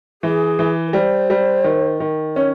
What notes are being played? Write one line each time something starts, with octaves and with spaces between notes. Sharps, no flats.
E3 G#4
E3
B4
G3 C5
G3
D#3
D#3
C#4 C#5